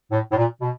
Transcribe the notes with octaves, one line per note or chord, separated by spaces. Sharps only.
A2
A2
A#2
B2